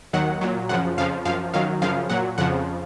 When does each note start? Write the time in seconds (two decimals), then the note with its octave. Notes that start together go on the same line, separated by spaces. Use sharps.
0.13 D#2 D#3 F#3 F#5
0.41 A#2 F#3
0.69 F#2 C#3 F3 F#5
0.98 F2 C#3 F3 F5
1.25 F#2 F3 F5
1.53 F#2 D#3 F#3 F5
1.82 F#2 C#3 F3 F5
2.10 A#2 F#3 F#5
2.38 F2 C#3 F3 F#5